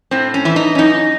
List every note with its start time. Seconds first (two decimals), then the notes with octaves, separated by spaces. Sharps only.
0.11 A2 C4
0.34 C#4
0.45 E3 E4
0.56 D#4
0.75 C#4
0.78 F#2 D#4